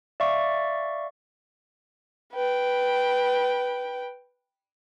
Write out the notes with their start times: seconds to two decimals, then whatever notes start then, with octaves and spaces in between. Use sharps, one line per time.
0.20 D5 E5 F5 C#6
2.34 B4 G5